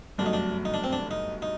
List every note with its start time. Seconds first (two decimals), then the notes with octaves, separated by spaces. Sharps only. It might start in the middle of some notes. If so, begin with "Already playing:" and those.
0.18 G1 F#2 F#3 A3 D4
0.26 D#4
0.33 D4
0.65 D#4
0.74 D4
0.84 C4
0.93 D4
1.11 D#4
1.42 D#4